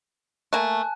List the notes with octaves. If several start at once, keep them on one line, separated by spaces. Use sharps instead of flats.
A3 A#3 G#5 A5 F#6